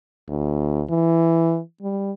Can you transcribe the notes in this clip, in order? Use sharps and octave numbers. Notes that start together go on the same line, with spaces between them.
D2
E3
G3